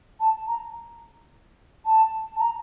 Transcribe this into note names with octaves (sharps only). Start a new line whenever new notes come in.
A5
A#5
A5
A5
A#5